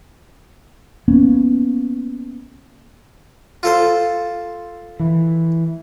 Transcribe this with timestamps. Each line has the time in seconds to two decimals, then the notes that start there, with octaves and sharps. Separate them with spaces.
1.08 A#3 B3 C#4
3.63 F4 A4 C5
5.00 E3